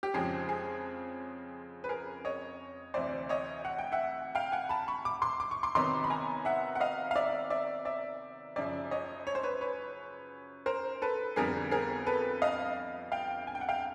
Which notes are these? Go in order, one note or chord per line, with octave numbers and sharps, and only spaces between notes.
G4
F2 C#3 F3 G#3 C4 G#4
G#4
B4
G#4 A#4
C#5 D#5
D2 C3 E3 C5 D5
C#5 D#5
F#5
G5
E5 F#5
F5 G5
F#5 G#5
A5 B5
B5 C#6
D6
C6 D6
D6
C#6
C6 D6
C3 D#3 F#3 B3 D#4 C6 D6
B5
G#5 A#5
E5 F#5
F#5
D#5 F5
F5
D5 E5
D5 E5
D5 E5
F#2 C#3 F3 D5 E5
C#5 D#5
C#5
C5
B4 C#5
B4 C#5
A#4 C5
A4 B4
F2 D3 G3 B3 G#4 A#4
G#4 A#4
A4 B4
D#5 F5
F5 G5
G#5
G5
F#5
F5 G5